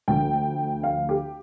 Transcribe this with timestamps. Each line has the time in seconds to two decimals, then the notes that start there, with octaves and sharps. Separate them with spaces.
0.08 D2 D3 F3 G5
0.83 F5
1.09 G4